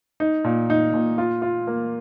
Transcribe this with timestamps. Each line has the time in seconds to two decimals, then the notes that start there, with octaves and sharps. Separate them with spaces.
0.20 D#4
0.44 A#2
0.70 D#4
0.94 A#2
1.18 F4
1.42 F4
1.67 A#3